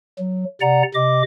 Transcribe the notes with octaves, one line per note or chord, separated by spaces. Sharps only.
F#3
C3 D5 F#5 A#5
C3 D#5 D6